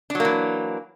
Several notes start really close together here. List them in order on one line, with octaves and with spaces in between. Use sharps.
D4 F#3 A#3 E3